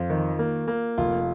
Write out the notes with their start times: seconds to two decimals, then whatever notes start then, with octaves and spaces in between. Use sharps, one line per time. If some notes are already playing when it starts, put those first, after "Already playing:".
Already playing: F2 F4
0.10 D#3
0.39 A#3
0.68 A#3
0.98 F1 F4